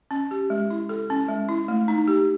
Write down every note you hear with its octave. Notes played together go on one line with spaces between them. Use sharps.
C#4
G4
G#3
E4
A4
C#4
G#3
E4
A3
D#4
G4